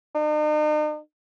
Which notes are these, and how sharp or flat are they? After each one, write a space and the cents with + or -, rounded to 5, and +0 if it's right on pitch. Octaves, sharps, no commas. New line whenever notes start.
D#4 -45